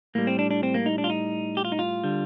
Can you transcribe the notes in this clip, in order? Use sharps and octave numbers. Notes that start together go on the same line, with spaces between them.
A2 G3 A#3
C4
D4
D4
C4
A#3
D#4
D4
F4
D#4
G4
F4
D#4
F4
D3 G3